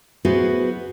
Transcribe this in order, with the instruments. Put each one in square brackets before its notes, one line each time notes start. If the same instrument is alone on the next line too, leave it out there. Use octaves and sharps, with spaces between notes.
[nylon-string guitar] B3 E4 F#4 G#4 B4 C5